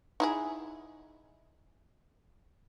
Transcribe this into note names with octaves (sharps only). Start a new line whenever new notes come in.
D#4 E4 G#4